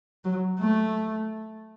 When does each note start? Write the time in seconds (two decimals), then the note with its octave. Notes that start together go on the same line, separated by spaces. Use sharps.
0.25 F#3
0.59 A3